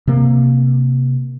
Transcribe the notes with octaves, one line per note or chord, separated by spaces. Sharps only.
C3 A#3